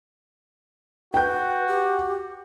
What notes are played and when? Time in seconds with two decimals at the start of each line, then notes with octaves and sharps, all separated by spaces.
1.14 F#4 B4 G5 G6
1.68 G4